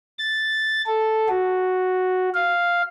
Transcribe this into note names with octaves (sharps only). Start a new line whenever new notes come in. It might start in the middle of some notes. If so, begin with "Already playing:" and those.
A6
A4
F#4
F5